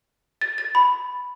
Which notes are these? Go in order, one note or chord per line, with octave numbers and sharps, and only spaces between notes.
A6
A6
B5